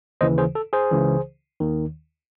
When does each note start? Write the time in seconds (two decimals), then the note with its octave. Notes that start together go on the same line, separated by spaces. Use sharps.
0.21 D#2 C#3 E3 C5 D#5
0.38 G#4 C5
0.55 A4
0.73 G#4 C5
0.91 C#2 C#3 E3
1.60 D#2 D#3